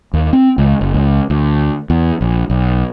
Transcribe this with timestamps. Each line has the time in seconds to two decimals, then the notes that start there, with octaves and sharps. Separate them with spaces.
0.13 D#2
0.33 C4
0.58 C#2
0.81 F#1
0.94 C#2
1.30 D2
1.90 E2
2.21 A#1
2.50 B1